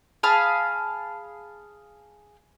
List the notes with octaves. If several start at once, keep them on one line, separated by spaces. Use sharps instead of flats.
G#4 F5 A5 B5